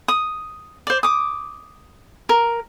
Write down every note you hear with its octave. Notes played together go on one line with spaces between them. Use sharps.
D#6
C5 D5
D6 D#6
A#4